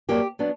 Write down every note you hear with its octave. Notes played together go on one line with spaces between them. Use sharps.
G2 F#3 A#3 G4
F#3 B3 D4